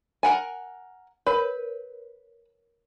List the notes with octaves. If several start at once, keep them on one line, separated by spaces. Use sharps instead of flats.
A#4 F#5 G#5
A#4 B4 C#5